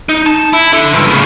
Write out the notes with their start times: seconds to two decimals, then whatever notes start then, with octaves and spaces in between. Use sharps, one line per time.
0.09 D#4
0.26 A5
0.53 E4
0.73 D4 A4
0.93 C#2 G2
1.10 A2 C#3